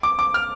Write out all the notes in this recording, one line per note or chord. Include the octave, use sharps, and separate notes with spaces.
D6
D6
F6